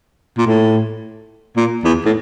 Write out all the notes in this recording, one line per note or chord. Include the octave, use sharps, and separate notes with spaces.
A#2
A2
A#2
E2
A2